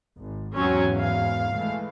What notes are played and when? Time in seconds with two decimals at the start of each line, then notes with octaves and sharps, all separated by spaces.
0.17 G#1
0.56 E2 G#2 E3 F#3 C4 C#4
0.96 F5
1.54 E3 G#3 A3